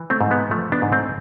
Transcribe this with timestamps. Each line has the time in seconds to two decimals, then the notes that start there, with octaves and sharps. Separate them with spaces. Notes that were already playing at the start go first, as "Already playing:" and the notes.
Already playing: E3
0.10 A3 C4
0.21 G#2
0.31 G#3 B3
0.51 F3 A3
0.72 B3 D4
0.82 G#2
0.92 A3 C4